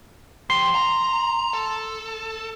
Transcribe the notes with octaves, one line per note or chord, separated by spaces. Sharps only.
F3 G4 C6
A#5
A4